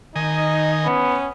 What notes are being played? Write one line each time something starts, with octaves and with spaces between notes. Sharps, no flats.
D#3 D#4 D#5 G#5
B3 C#4